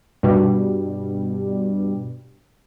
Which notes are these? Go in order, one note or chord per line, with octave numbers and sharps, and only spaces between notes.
G2 B2 G3